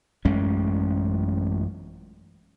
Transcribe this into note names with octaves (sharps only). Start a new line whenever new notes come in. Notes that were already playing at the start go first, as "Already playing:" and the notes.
A1 F#2 G#3 C#4